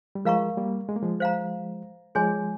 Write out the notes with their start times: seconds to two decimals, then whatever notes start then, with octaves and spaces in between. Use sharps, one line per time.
0.15 G3
0.25 F3 G#3 A#4 F5 A#5 C#6
0.57 G3 A#3
0.89 G#3
0.96 A#3
1.03 F3 G#3
1.20 C5 F5 A#5
2.15 F3 G#3 G#4 C#5 G#5 C6